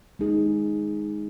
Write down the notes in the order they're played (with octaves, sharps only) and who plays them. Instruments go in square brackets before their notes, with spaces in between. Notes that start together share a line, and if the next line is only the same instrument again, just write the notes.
[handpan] G#3 D#4 G#4